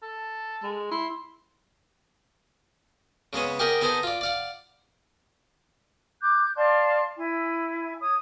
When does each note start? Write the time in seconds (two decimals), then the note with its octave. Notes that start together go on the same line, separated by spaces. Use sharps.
0.02 A4
0.63 G#3
0.91 E4 C6
3.33 C#3 G#3 B3 C#4
3.59 G4 G#4 A#4 D#5 F#5 G5
3.81 B3 D#4 G#4 A4 C5 A#5
4.03 F4 D5
4.21 D5 F5 F#5
6.22 D6 F#6 G6
6.56 D5 F5 A5 C6
7.17 E4 G#5
8.00 C#5 D#6